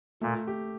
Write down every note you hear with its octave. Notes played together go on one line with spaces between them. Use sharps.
A#2 A3
G4